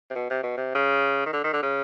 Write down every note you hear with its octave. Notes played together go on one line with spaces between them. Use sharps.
C3
B2
C3
B2
C3
C#3
D#3
D3
D#3
D3
C#3